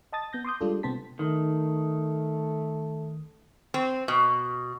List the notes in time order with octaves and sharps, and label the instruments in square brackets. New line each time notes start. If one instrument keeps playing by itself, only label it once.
[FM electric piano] D#5 A5 D#6 A6
B3 G6 A#6
C6 D6 D#6 G6
G3 G#3 D4 F4 A4
C3 B3 C4 C5 A5 B6
[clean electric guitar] D#3 [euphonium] A3
[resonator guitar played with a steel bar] C4
B2